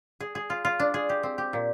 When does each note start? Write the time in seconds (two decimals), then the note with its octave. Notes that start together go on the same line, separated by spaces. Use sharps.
0.20 G#4
0.35 G#4
0.50 F4
0.65 F4
0.80 D4
0.94 G#4
1.09 G4
1.23 C4
1.38 G4
1.53 A#2